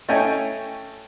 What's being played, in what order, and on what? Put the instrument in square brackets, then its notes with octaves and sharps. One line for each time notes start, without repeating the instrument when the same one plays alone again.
[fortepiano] A3 C#4 D#5 G5 G#5